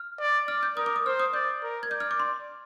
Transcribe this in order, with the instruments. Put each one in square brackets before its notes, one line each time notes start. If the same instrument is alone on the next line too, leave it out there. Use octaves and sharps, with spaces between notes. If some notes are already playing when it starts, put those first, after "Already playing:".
Already playing: [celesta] F6
[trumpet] D5
[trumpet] D5 [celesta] F6
[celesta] G6
[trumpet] A#4 [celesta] D#6
[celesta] D6
D#6
[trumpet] C5 [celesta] F6
[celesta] D#6
[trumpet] D5 [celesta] G6
[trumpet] A#4
[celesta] G#6
[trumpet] D5 [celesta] G6
[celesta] F6
D6
C6